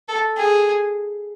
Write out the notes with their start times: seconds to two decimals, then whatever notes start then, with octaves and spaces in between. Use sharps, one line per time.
0.08 A4
0.37 G#4